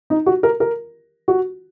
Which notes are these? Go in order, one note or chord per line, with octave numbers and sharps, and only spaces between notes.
D#4
F#4
A#4
A#4
F#4